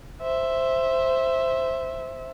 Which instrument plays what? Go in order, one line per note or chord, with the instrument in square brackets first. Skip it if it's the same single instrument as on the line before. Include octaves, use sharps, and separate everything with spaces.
[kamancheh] C5 E5